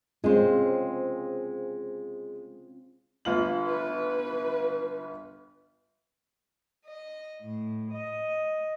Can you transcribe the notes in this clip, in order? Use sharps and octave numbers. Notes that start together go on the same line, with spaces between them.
G#3 C4 C#4 F4 C5
G1 F4 F#7
B4
D#5
A2
D#5